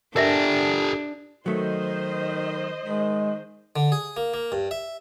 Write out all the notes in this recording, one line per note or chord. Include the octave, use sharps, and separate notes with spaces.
D4 G4 A4 A#4 D#5 E5
D#3 F#3 A3 C5 D#5
D#3 G#3
D3
G#4
A#3
A#3
G2
E5